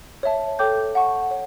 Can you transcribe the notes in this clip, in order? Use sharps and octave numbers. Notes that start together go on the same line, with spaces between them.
C#5 E5 A5
A4 C#5 G5 D6 G6
F#5 A5 C#6
C#5